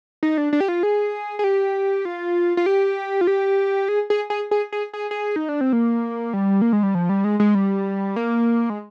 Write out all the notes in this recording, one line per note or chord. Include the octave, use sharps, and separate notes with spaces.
D#4
D4
D4
G4
F4
G#4
G#4
G4
F4
F4
G4
F4
G4
G#4
G#4
G#4
G#4
G#4
G#4
G#4
D#4
D4
C4
A#3
G3
A#3
G#3
G3
F3
G3
G#3
G#3
G3
A#3
G#3